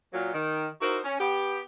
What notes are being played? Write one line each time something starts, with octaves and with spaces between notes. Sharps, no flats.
A#2 F#3
D#3
D#4 E4 F#4 A#4 C5
C#4
B3 G4